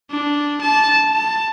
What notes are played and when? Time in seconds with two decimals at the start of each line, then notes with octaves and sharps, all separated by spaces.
0.11 D4
0.61 A5
1.12 A5